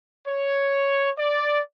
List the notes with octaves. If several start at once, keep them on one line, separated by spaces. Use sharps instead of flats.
C#5
D5